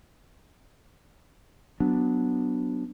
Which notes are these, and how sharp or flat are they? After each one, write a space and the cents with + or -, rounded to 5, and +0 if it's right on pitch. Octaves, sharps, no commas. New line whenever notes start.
F#3 +0 B3 +0 D4 +0